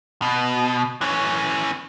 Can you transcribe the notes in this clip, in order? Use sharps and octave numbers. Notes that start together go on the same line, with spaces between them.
B2
E3 C#4